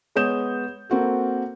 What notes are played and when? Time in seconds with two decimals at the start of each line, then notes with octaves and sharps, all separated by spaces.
0.15 G#3 B3 C#5 D#6 G6 E7
0.90 A#3 C4 F#4 A4